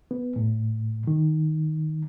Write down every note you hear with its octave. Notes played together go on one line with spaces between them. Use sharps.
B3
A2
D#3